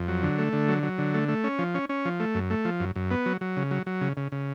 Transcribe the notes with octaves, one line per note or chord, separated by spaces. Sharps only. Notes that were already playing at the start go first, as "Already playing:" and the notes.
Already playing: F2
F#3
D3
A3
D3
F#3
F#3
D3
A3
A3
C#4
F3
C#4
C#4
F3
A3
F#2
A3
F3
F#2
F#2
B3
F#3
F#3
C#3
F#3
F#3
C#3
C#3
C#3